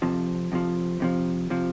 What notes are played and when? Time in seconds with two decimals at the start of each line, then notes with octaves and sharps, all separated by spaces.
0.02 F2 C3 F3
0.52 F2 C3 F3
1.00 F2 C3 F3
1.50 C3 F3